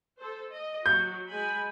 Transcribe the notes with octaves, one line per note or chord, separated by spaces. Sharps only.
A4 C5
D#5
F#3 F#4 G6
G#3 G#5 B5